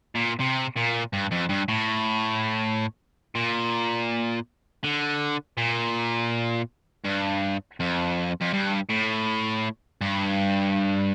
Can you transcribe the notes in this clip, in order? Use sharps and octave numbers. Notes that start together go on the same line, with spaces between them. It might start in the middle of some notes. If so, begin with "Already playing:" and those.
A#2
C3
A#2
G2
F2
G2
A2
A#2
D3
A#2
G2
F2
F2
G2
A2
G2